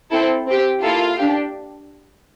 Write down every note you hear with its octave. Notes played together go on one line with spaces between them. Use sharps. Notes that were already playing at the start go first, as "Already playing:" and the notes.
C4 E4 A4
C4 G4
A#3 E4 F4 A4 F5
D4 G4